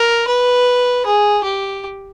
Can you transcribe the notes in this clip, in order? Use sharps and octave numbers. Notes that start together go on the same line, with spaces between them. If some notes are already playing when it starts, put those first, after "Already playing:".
Already playing: A#4
B4
G#4
G4